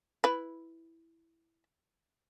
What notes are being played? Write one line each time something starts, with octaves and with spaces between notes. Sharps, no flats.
E4 B4